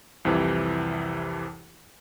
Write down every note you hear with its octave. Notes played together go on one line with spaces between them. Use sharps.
C2 F2 C3 E3